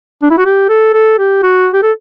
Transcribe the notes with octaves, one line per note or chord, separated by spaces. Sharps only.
D4
E4
F#4
G4
A4
A4
G4
F#4
G4
A4